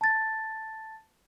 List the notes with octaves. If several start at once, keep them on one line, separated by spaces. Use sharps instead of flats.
A5 A6